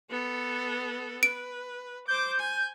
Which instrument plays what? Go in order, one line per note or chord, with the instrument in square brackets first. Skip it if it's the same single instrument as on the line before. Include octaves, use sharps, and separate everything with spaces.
[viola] B3 A4
[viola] B4 [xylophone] D7
[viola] C5 D6 [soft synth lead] G6
[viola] G#5